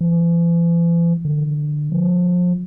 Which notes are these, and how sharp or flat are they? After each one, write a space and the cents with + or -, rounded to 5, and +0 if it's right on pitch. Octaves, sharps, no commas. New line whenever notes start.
E3 +45
D3 +20
F3 +30